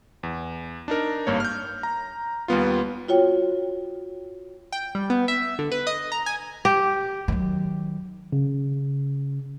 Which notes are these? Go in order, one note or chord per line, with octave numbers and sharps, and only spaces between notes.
E2
D4 D#4 A#4
G#1 G2 A#3 C#5
F6 G6
A#5
D#2 G3 B3 F4
F4 F#4 C#5 G5
G5
G3
B3
E5
D3
B4
D#5
A#5
G#5
G4
D#3 F#3
C#3